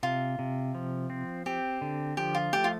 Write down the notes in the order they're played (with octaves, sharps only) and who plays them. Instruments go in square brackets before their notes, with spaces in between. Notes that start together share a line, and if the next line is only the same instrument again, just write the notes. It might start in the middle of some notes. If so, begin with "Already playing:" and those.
[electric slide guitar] C3 [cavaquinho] F4
[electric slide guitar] C3
F3
C4
[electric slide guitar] C4 [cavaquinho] G4
[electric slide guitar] D3
[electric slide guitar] F3 [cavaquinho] G4
[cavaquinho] F4
[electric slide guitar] A3 [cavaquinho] G4
[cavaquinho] F4